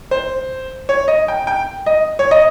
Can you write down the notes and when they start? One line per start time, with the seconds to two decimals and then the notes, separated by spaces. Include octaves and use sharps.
0.11 C5
0.89 C#5
1.08 D#5
1.28 G5
1.47 G5
1.86 D#5
2.19 C#5
2.31 D#5